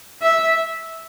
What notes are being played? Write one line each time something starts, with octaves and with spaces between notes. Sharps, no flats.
E5